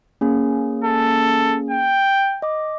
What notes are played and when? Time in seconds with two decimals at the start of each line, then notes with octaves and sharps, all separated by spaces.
0.21 A#3 C#4 G#4
0.84 A4
1.71 G5
2.42 D#5 D6